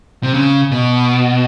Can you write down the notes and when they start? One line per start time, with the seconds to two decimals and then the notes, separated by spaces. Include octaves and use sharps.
0.23 C3
0.34 C#3
0.72 B2